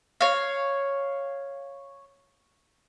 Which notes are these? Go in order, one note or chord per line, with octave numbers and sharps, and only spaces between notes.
C#5 F5